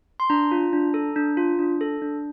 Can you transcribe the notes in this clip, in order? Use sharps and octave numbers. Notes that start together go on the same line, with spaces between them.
C6
D4 A#5
F4
D4
A4
D4
F4
D4
A4
D4